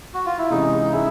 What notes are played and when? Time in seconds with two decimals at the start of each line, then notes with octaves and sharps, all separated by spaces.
0.14 F#4
0.26 F4
0.38 E4
0.50 C3 E3 G#3 C#4 D#4
0.92 G#3 C#4 E4